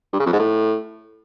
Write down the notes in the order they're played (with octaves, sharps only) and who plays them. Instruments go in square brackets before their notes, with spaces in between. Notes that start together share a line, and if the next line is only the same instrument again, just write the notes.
[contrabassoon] G2
C#3
F2
G#2
A2